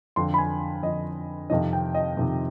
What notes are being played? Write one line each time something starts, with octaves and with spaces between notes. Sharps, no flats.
F2 D3 C6
B5
G#5
F2 D3 D#5
F2 C3 D#3 D#5
G5
D#5
F2 C3 D#3